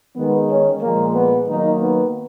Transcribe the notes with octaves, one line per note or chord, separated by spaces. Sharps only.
D#3 G#3 B3
C#4
A#2 F3 G#3 A#3
B3
D#3 F#3 A#3 D#4
B3